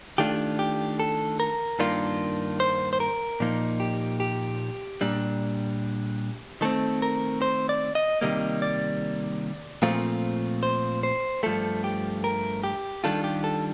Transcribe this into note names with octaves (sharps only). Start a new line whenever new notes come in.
D#3 A3 D4 F4 G4
G4
A4
A#4
G2 D#3 A#3 D4 F4
C5
C5
A#4
A#2 F3 A#3 D#4
G4
G4
A#2 G3 D4
D#3 A3 C4 A4
A#4
C5
D5
D#5
C3 D#3 G3 A#3 D#5
D5
A#2 F3 A3 C4 F4
C5
C5
G2 F3 A3 A4
G4
A#4
G4
D#3 G3 D4 F4 A4
G4
A4